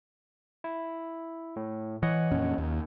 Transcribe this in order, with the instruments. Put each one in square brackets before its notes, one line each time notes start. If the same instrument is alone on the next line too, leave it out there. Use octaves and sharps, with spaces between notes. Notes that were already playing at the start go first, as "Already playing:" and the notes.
[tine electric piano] E4
A2
[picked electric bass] E3 [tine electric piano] C#5 D#5 F#5
[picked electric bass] F2 A#2 C#4
D#2